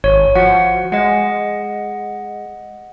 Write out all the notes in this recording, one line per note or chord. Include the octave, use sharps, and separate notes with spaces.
G#1 C#5
F3 F#4 F#5
G#3 D#5 F#5